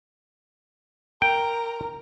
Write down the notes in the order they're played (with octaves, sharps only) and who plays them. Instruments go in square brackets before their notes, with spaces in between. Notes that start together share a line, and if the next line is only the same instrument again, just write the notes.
[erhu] A#4 [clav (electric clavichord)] G5